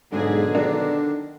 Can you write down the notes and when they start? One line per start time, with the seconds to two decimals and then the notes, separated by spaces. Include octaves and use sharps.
0.12 B1 G#2 D3 G#4
0.55 D#3 D4